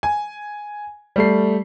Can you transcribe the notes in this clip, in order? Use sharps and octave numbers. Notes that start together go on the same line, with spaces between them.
G#5
G3 A3 C7